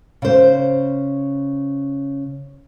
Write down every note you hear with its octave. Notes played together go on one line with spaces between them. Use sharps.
C#3 C5